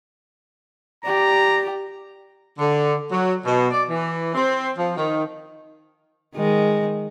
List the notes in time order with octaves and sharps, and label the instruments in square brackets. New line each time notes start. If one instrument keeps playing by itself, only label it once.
[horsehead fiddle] G4 D5 [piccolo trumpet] A#5
[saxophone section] D3
F#3
B2
D5
E3
C4
F3
D#3
[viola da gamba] D#3 G#3